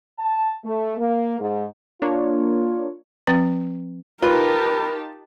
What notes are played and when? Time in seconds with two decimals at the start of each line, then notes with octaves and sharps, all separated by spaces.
0.18 A5
0.63 A3
0.97 A#3
1.39 G#2
2.02 A#3 D4 F4 C#5
3.27 F3 C4 B4 G5
4.22 D#4 F4 G4 A#4 B4 A5